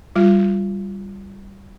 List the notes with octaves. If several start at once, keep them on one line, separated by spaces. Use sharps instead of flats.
G3 F4